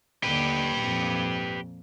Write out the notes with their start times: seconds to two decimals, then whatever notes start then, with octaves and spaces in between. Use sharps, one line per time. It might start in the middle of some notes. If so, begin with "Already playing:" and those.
0.23 D#2 D3 G4 B4
0.77 F2 A#2